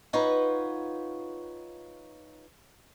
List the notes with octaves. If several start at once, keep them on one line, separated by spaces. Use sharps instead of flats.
D#4 F4 B4 C#5 F#5